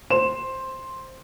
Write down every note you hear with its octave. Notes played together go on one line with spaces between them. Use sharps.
C5 C6 E7